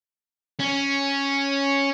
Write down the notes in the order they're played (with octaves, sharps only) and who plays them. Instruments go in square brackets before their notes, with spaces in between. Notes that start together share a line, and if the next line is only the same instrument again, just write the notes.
[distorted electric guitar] C#4